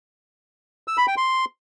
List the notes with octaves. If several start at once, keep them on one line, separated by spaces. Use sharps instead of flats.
E6
B5
G5
C6